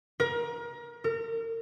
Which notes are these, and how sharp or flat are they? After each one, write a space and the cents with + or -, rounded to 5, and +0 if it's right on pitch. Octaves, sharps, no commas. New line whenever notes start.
A#4 +30
A#4 -35